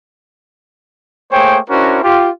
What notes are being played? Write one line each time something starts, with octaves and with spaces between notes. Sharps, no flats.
A3 A#3 G#4 C5 C#5 G5
C#4 D4 E4 F#4 A#4 C5
F4 G4